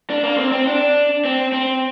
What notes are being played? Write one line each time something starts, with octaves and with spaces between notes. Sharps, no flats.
D4
A#3
C4
C4
D4
C4
C4